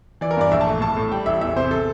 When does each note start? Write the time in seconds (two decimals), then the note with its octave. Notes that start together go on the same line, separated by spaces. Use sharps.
0.21 E3 D5
0.31 A#4
0.37 G2 D5
0.51 A#1 E5
0.61 A5
0.67 A3
0.81 A2 A5
0.97 A2
1.12 G3 G5
1.26 A1 E5
1.41 E2 E5
1.56 C3 C5
1.71 A4